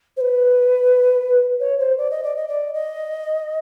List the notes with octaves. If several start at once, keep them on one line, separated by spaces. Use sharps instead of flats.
C5
B4
C#5
C5
D5
D#5
D5
D#5
D5
D#5